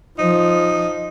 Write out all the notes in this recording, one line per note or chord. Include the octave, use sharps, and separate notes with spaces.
F3 D#4